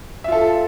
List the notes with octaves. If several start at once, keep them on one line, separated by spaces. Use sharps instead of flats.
F4 A4 E5